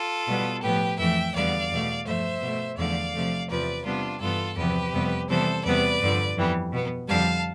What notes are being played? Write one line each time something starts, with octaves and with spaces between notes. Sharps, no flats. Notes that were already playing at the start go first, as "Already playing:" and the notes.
Already playing: F4 A4
B2 G3 B3
A2 F3 B3 G4 B4
F2 E3 A3 E5 G5
E2 D3 G3 B3 D5 F5
E2 B2 A3
G2 F3 A3 C5 E5
B2
A3
E2 D3 F3 A3 D5 F5
C3 F3 A3
E2 C3 F3 B4 D5
C3 G3 B3 D4 F4
G2 E3 B3 F4 A4
E2 C3 F3 B3 G4 B4
F2 C3 G3 B3
C3 E3 G3 B3 A4 C5
E2 C3 G3 B3 B4 D5
G2 D3 F3
F2 E3 G3 B3
B2 B3
F2 D3 G3 F5 A5